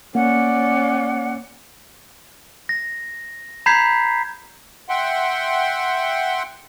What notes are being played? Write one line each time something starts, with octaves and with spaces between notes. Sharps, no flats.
A#3 C#4 D5 F#5
A#6
A#5 B5 G6 G#6 B6 C7
E5 F#5 G5 C6